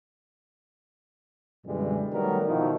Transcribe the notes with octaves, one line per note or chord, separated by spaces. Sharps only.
F#2 B2 D3 E3 G3 G#3
D#3 F#3 G3 A3 B3 A#4
B2 D#3 F3 D#4 E4 F#4